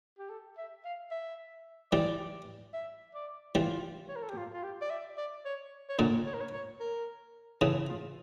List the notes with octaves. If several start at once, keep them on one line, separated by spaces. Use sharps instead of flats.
G4
A4
E5
F5
E5
E3 G3 D5
E5
D5
E3 G3 F4
C#5
A#4
A4
G4
F4
F4
G4
D5
E5
D5
C#5
C#5
A#2 D3 A#4
C#5
A#4
C#5
C#5
A#4
C#3 E3 A4
F4